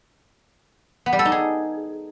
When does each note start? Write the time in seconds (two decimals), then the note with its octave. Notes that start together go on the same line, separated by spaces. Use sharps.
1.06 B3
1.13 G3
1.19 A4
1.25 D#4
1.32 G#4